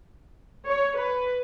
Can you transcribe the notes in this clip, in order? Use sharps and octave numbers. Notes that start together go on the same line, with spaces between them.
C#5
B4